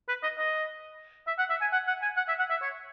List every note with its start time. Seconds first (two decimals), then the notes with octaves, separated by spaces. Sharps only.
0.08 B4
0.23 D#5
0.38 D#5
1.27 E5
1.38 F#5
1.50 E5
1.61 G#5
1.73 F#5
1.87 F#5
2.02 G#5
2.17 F#5
2.28 E5
2.39 F#5
2.50 E5
2.61 C#5